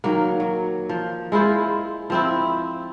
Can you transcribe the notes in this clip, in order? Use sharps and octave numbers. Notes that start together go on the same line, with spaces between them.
D#3 F#3 A#3
F#3
F3
G#3 E4 F4 C5
F3 C4 E4